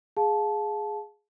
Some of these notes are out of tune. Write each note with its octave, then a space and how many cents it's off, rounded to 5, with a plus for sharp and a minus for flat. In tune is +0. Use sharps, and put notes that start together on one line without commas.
G#4 +0 F5 +25 A5 -20